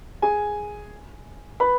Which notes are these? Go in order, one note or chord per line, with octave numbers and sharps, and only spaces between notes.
G#4 G#5
B4 B5